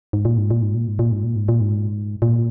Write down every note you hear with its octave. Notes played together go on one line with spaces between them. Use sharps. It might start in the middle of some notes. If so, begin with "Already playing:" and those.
G#2
A#2
G#2
A#2
G#2
A#2
G#2
A#2
G#2
A#2
G#2
A#2
G#2
A#2